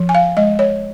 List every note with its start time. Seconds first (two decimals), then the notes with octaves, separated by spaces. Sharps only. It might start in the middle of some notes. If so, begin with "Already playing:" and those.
Already playing: F3
0.09 G#5
0.15 F5
0.37 G#3 D#5
0.59 C#5